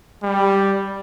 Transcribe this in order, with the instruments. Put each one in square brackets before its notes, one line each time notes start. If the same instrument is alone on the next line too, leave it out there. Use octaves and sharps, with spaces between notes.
[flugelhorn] G3